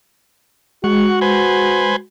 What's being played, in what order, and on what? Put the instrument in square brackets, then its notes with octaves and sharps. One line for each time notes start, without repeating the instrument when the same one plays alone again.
[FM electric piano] G#3 [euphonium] F#4 [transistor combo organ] F#5 C#6
[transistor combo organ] B4 C5 G#5